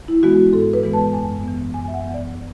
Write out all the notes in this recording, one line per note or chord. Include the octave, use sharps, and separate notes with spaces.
E4
E3 G#3 B3 F#4
G#2 A4
B4
E3 G#3 B3
A5
F#2 G#5
E3 B3
F#2 G#5
E5
F#5
E3 B3
D5